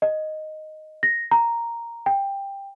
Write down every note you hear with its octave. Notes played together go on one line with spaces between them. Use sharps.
D#5
A#6
A#5
G5